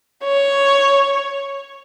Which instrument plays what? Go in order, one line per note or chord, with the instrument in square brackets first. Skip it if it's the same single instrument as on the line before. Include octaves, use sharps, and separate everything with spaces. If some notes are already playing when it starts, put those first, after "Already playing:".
[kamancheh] C#5